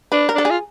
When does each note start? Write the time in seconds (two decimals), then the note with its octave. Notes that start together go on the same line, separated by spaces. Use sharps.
0.12 D4 B4
0.29 A#4
0.35 D4 A4
0.45 G#4
0.50 F4